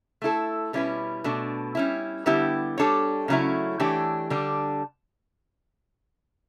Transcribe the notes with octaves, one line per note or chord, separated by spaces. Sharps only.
A3 E4 A4
B2 G3 C#4 E4 B4
B2 A3 D4
G3 C#4 E4
D3 G3 B3 E4 G4
G3 D4 A4 C#5
C#3 F#3 A3 C#4 E4
E3 A3 D4 G4 C#5
D3 G3 D4